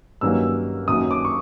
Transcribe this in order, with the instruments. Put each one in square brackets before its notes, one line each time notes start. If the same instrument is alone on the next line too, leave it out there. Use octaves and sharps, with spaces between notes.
[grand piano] G2 D#3 F#3 A#3 C#4 E6
F#2 D#3 F#3 A#3 C#4 D#6
D6
C#6